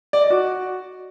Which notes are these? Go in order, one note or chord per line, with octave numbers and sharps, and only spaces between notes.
D5
D#5
F#4